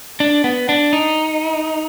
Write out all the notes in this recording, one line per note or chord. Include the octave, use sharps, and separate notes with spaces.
D4
B3
D4
D#4